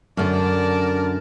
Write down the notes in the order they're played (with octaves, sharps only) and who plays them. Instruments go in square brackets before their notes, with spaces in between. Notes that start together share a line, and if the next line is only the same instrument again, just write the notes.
[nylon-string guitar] F#2 D3 [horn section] A#4 D5 A5